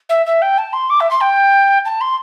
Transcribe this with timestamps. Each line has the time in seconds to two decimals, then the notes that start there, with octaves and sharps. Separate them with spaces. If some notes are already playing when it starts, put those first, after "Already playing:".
0.09 E5
0.26 E5
0.41 G5
0.58 A5
0.73 C6
0.90 D6
1.00 E5
1.10 C6
1.21 G5
1.85 A5
2.01 C6